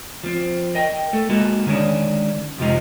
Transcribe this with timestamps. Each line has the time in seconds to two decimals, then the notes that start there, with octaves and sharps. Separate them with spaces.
0.24 F3 C4
0.75 A#4 D#5 G5
1.13 A3 A4
1.30 G#3 A#3 D#4 F#4 A4
1.66 D3 D#3 G#3 C#4 D4
2.58 F2 C3 F3 G#3 D#4